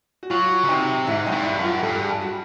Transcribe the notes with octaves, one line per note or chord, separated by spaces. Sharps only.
F#4
F#3 F4
C#3
C3 D#4
G#2 E4
F#2 D#4
G2
E4
F#2
F4
G2 A4
G#4
F#4